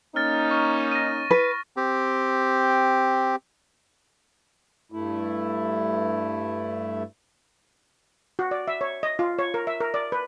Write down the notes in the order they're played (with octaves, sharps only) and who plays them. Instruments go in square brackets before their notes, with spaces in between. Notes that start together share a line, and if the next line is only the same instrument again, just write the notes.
[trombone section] A#3 C#4 D#4 [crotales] F6 A6
[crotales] C#6
A#6 D#7
[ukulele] B4
[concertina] C4 G4
[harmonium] G2 A3 E4
[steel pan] F#4
D5
E5
C#5
D#5
F4
C#5
A#4
E5
A#4
D5
B4